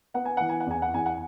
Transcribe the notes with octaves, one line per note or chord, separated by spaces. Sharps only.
B3 F#5
G#5
E3 F#5
G#5
F#5
E2 G#5
F#5
E2 G#5
F#5